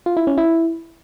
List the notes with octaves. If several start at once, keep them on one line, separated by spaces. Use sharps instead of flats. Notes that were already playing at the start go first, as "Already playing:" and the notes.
F4
E4
C#4
E4